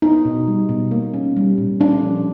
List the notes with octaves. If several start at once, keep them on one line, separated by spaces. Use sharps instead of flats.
B3 D#4
B2
G3
B2
A#3
C#4
G3
A#2
C#4 D4
F3